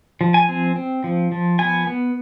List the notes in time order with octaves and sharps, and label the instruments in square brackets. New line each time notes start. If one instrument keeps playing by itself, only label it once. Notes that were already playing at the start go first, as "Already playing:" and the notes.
[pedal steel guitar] F3
G#5
C4
C4
F3
F3
B3 G#5
B3